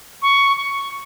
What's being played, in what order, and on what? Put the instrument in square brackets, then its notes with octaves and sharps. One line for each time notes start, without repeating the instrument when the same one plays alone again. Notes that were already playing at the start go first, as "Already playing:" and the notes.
[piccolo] C#6
C#6